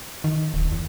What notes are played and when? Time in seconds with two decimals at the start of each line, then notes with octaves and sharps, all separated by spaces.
0.24 D#3
0.54 D1
0.72 E2